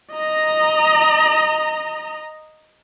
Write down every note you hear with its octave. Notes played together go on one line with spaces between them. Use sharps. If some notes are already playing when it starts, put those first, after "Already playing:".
D#5 A#5